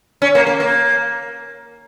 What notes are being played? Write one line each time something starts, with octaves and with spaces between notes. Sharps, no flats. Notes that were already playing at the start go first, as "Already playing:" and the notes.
C#4
A#3
A#3
A#3